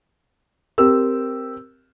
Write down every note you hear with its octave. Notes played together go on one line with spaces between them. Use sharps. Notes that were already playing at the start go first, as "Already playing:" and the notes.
C4 G4 A#4 E6